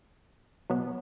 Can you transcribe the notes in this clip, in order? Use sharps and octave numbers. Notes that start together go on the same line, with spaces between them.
B2 F#3 B3